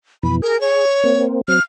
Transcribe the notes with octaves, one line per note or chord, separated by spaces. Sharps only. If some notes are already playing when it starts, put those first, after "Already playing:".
F2 B2 E3 B5
G#4 A#4
C#5
A#3 C4
F#3 C4 F6